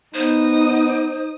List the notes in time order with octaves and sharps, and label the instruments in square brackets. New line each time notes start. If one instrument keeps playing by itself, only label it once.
[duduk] B3 [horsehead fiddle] D#4 [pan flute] C5 [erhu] D#6